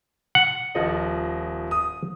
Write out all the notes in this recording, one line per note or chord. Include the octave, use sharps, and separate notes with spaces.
F#5
D#1 F3 D#5
D#6